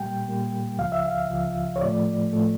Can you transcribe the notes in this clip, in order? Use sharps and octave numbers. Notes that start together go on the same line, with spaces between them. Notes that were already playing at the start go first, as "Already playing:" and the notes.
Already playing: A#2 G3 A#3 G5
A#2 G3 A#3
C#2 C#3 F3 F5
E5
F5
C#2 C#3 F3
C#5
A2 F3 A3 D5
A2 F3 A3